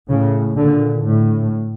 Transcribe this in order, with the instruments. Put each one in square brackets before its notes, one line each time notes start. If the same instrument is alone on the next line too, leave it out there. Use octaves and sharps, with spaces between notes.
[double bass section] A2 C#3
A#2 D3
A2